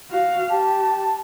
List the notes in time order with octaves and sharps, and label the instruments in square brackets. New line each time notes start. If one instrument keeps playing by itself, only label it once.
[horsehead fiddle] F#4 F5
[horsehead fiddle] G4 [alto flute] A5